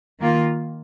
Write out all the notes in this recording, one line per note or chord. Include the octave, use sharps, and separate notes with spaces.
D#3 A#3 F4